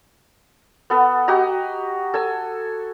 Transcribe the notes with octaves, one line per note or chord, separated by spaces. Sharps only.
B3 A4 B4
F#4 G4 D#5 A#5
A4 G#5 E6